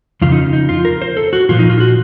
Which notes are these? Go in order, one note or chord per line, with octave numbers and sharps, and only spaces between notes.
F2 C#3 F3 F4
D#4
D#4
F4
A#4
C5
A4
F#4
A#2 F3 F4
D#4
F4
F#4